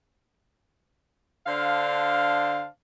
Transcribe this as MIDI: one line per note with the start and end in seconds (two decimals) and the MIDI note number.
1.46 2.65 50
1.46 2.65 62
1.46 2.65 72
1.46 2.65 77